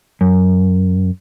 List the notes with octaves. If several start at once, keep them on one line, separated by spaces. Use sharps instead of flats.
F#2